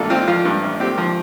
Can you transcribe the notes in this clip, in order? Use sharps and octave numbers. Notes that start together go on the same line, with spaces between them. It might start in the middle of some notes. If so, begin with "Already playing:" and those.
Already playing: A1 G2 F4 A4
C4 F4
F3 F4
G2
A1
C4 G4
F3